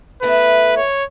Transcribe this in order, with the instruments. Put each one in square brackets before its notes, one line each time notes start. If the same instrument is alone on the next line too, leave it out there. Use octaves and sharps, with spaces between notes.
[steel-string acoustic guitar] A3 B3 E4 [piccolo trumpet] B4
[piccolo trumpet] C#5